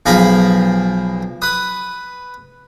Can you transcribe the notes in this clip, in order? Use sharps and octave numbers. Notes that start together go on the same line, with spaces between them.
B1 F3 G#4 A#4 A#5 B5
B4 D#6